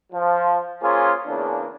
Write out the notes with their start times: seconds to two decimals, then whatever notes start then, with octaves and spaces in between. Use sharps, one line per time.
0.12 F3
0.82 A#3 C#4 F4 G#4 C5
1.27 E2 C#3 A#3 D4